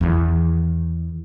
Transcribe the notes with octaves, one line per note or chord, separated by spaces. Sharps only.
E2 D#3